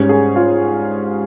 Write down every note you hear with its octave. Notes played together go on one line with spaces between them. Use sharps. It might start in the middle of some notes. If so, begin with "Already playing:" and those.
Already playing: G#2 G3 C#4 C#5
G#4
F4